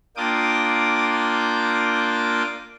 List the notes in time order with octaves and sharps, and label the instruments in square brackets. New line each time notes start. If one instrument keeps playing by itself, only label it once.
[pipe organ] A#3 D4 F4 G5 D6 D#6